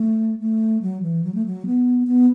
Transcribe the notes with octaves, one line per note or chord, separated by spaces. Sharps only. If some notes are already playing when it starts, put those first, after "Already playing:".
Already playing: A3
A3
F#3
E3
F#3
A3
F#3
B3
B3